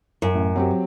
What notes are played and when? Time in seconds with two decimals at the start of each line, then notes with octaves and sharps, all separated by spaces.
0.22 F#2
0.35 A1
0.56 F#3 C4 G4